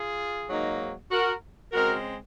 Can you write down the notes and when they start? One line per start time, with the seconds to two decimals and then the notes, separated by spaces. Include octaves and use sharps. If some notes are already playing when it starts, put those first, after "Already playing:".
Already playing: F4 G#4
0.48 G#2 F#3 A#3 D#4
1.10 F#4 A#4
1.72 C#3 G#3 C4 F#4 A#4